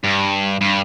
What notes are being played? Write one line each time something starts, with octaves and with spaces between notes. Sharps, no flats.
G2
G2